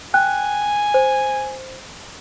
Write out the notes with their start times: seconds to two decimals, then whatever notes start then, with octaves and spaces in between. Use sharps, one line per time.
0.14 G5 G#5 F#6
0.94 C5